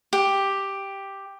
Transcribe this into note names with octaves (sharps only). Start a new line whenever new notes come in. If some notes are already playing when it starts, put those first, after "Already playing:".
G4